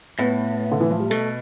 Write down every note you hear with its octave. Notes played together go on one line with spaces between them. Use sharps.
A2 B3
D3
E3
F3
G3
B2 A3